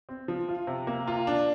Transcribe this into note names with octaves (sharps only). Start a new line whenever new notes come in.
C4
F3
F4
C3
A#3
F4
D4